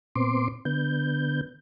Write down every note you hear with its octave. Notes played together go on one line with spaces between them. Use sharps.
A#2 B3 C4 C6 D6
D3 B3 G6